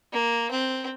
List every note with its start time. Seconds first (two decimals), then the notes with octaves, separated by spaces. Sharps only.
0.12 A#3
0.51 C4